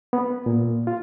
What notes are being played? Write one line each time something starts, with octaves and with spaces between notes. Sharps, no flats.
B3
A#2
F4